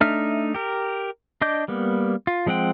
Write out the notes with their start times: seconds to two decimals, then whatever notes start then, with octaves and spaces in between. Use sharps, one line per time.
0.01 A3 D4 D#4 E5 F6
0.54 G4 A#4
1.42 D4 D#5 D6 G6
1.68 G3 A#3 B3
2.27 F4
2.46 F3 G#3 C4 F#5 G5